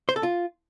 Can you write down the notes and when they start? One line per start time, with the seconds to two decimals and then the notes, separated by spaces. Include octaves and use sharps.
0.09 C5
0.16 A4
0.23 F4